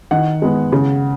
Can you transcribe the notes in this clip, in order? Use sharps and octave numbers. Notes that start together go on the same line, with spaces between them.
D#3 F#5
G#3 B3
C#3